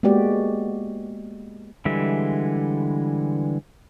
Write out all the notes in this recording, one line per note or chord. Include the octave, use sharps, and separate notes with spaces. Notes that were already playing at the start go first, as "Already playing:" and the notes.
G#3 A#3 B3 F#4 G4 D5
D3 E3 G3 G#3 E5